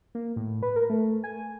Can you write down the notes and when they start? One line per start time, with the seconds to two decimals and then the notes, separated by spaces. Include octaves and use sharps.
0.15 A#3
0.36 A2
0.63 B4
0.76 A#4
0.90 A3
1.24 G#5